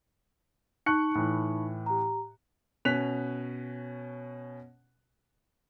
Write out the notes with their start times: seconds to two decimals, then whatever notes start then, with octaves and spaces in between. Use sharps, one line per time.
0.86 D#4 A5 C#6 F#6 C#7
1.15 A2 E3
1.86 G4 A#5
2.85 B2 C#4 F#6 B6 F7